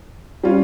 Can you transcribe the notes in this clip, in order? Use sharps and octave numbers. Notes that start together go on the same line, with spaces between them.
G3 C#4 F4